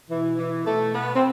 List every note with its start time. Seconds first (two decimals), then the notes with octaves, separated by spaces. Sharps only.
0.09 B2 E3
0.37 E3
0.66 B2 A3
0.94 B3
1.15 C4